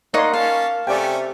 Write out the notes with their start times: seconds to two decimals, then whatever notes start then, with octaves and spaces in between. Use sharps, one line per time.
0.14 A#3 D#4 C#5 D5 F#5 C6
0.34 C#4 F5 A5
0.87 C3 A3 C#4 D5 G5 G#5